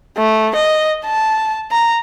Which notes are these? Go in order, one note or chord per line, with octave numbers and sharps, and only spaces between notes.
A3
D#5
A5
A#5